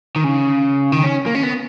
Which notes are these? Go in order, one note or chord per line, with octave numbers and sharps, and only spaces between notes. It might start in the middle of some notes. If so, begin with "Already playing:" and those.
D#3
C#3
D#3
C#4
A#3
C#4
B3